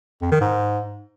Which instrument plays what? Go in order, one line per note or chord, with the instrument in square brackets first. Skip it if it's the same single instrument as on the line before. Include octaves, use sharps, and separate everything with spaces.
[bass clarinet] F2
D#3
G#2